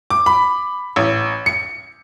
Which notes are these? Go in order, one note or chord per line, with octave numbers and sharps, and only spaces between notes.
D6
B5
A1
C#7